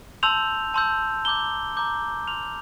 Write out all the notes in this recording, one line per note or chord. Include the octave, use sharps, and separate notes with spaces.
A5 C6 E6 G6 F7
A5 C6 E6 G6
A#5 D6 G6 G7
A#5 D6 G6
C6 F6 F7